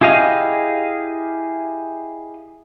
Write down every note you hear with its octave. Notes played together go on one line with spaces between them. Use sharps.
E4 G4 G#4 D#5 F5